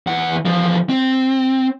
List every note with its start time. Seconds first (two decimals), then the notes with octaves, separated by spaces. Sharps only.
0.07 E2 F#5
0.45 E2 F3
0.90 C4